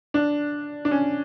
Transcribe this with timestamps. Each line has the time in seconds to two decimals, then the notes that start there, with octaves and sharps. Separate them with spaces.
0.14 D4
0.85 D4
0.91 C#4